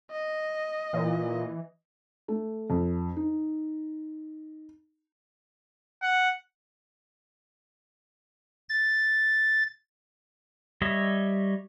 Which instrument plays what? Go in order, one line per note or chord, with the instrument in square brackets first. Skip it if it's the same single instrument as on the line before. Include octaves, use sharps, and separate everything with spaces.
[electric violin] D#5
[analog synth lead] A#2 [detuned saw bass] E3
[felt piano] A3
F2
D#4
[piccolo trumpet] F#5
[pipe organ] A6
[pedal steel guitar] G3 C#5 D#5 E5